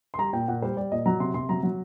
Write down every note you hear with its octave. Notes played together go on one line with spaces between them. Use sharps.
C6
G3 A#5
A#2 G5
A#2 F#5
G3 C5
G3 D5
A#2 D#5
F#3 A#5
C3 C6
C3 C6
F#3 A#5
F#3